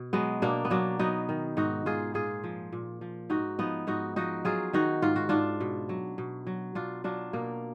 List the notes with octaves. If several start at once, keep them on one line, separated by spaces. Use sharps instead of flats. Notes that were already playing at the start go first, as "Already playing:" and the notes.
Already playing: B2
F#3 G#3 B3
B2 A#3 D4
B3
F#3 A#3 D4
F#3 B3 D#4
D#3
G#2 D#4 F#4
G#2 F4 G#4
A#2 F4 G#4
F3
A#2
F3
G#2 D#4 F#4
F3 B3 D#4
G#2 D#4 F#4
F3 D#4 F#4
F#3 F4 G#4
D#3 D#4 F#4
G#2 F4
F#4
G#2 D4 F4
B2
F#3
B2
F#3
B2 D4 F4
F#3 D4 F4
B2 A#3